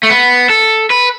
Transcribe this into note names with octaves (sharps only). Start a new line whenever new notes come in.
A3
B3
A4
B4